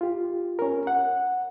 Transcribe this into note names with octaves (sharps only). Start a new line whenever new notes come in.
F4 G4
C#4 A#4
F#5